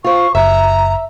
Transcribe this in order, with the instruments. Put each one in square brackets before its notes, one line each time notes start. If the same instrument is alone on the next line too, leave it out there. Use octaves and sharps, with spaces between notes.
[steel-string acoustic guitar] F4 C5 [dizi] C#6
[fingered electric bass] F#1 [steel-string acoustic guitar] E5 [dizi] A#5